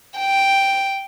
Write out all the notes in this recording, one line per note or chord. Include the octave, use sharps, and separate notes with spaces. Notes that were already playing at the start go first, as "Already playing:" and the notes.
G5